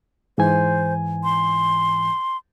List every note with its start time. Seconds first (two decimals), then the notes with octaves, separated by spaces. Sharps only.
0.38 G#2 E3 C5 G#5
1.24 C6